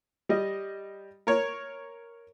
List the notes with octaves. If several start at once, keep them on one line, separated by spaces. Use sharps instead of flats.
G3 D#5
A#4 C#5